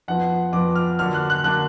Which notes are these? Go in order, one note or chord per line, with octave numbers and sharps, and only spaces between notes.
F2 F3 B3 F#5
F2 F3 B3 D6
F6
D3 F#3 A#3 D4 F6
F#6
F#6
D3 F#3 A#3 D4 F#6